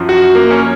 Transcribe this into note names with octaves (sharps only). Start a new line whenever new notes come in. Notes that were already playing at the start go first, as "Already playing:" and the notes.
Already playing: F#2 F3
F#4
A#3
C#4